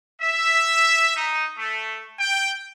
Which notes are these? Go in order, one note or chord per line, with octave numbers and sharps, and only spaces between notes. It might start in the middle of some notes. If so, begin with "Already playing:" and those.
E5
D#4
A3
G5